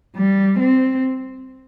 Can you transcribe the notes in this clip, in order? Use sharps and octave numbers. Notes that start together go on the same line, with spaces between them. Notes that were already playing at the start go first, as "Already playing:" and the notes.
G3
C4